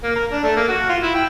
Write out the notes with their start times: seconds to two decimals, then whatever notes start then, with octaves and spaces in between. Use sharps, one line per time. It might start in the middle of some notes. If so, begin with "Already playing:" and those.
0.03 A#3
0.16 A#4
0.31 D4
0.43 A3
0.56 A#3
0.68 F#4
0.89 F4
1.02 E4
1.14 G5